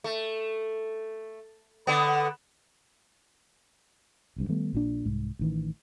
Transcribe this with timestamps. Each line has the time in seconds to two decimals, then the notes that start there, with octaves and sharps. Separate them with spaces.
0.04 A3
1.87 D3 B3
4.36 F#1 C2 G2
4.49 D#3 G3 A3 B3
4.73 A#1 A#2 D4
5.05 C2 G#2
5.39 A1 D#3 E3